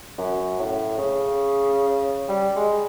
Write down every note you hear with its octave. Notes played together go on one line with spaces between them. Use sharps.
F#2
A2
C#3
G3
G#3